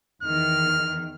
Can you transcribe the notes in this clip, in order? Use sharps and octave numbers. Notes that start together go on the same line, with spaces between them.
E2 D#3 F6